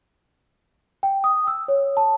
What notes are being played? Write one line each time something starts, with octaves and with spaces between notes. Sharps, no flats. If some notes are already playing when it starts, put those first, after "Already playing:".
G5
D#6
E6
C#5
A5